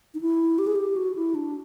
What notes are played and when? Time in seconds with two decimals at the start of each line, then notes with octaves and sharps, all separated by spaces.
0.14 D#4
0.21 E4
0.58 G4
0.67 G#4
0.75 G4
0.96 F#4
1.15 E4
1.35 D4